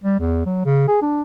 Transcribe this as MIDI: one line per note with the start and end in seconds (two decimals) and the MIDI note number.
0.03 0.18 55
0.20 0.42 40
0.46 0.60 54
0.65 0.87 49
0.88 0.98 68
1.02 1.22 62